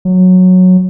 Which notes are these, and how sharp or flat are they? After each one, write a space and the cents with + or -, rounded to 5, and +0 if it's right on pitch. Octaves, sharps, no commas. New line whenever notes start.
F#3 -10